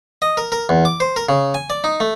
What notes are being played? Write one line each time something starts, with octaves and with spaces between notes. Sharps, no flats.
D#5
A#4
A#4
E2
D6
C5
A#4
C#3
G#5
D5
D#4
A3